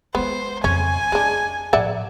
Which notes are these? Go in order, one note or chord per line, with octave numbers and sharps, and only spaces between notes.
G#3 B3 E4 C5
F2 C#3 C#4 G#5
G#3 C#4 D4
A2 F3 D5 E5 F#5